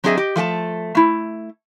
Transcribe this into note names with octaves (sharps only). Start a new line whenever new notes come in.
F#3 C4 D4 G#4 D#5 E5
G4 D#5
F3 A3 G5 A5
A3 E4